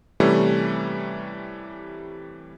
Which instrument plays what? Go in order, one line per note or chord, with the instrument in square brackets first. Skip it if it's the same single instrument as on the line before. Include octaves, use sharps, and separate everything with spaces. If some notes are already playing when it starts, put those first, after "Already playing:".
[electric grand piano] C3 E3 G3 A3 C#4